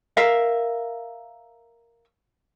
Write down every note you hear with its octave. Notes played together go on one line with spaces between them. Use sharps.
A#4 E5 F5